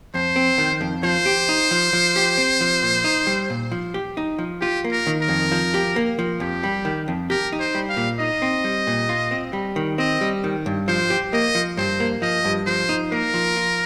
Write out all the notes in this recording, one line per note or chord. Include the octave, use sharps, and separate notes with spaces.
F2 C5
C4
D#3
F2
F3 C5
G4
D#4
F3
F3
G4
C4
F3
A#2
D#4
G3
A#2
F3
G4
D#4
F3
F4 G4
A#3
A#4
D#3
A#4
F2
F3
G4
A#3
F3
F2 G4
G3
D#3
F2
G4 A#4
D#4
C5
G3
F5
A#2
D#4 D#5
C4
G3
A#2
F4
C4
G3
D#3
C4 D#5
G3
D#3
G2
F3 C5
G4
A#3 D#5
F3
G2 C5
A#3
F3 D#5
G2
F3 C5
D#4
A#3 A#4
F3
F4